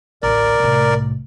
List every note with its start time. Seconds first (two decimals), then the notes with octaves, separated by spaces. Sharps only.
0.23 A1 D2 A#4 D5
0.60 C2 A2